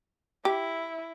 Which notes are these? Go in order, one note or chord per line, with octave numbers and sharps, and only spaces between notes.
E4 G4